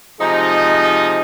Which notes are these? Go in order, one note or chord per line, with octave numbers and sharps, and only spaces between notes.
C3 F3 G#3 D#4